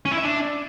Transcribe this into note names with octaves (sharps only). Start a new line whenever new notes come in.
C#4
E4
E5
D4